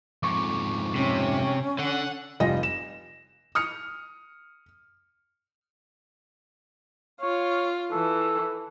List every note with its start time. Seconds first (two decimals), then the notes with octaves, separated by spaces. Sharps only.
0.23 F2 G#2 C#6 D6
0.96 C3 C#4
1.79 D3 F#5
2.40 F1 G3 F4 D#5 A#6
2.63 E7
3.55 D#6 F6 C#7
7.21 F4 C#5
7.92 E3 A4